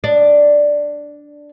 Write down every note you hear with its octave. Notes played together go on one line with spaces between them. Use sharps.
D4